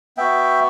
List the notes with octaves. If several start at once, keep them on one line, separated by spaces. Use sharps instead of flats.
B3 F#4 E5 G5